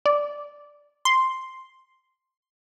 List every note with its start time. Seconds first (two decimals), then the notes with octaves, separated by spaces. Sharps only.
0.06 D5
1.05 C6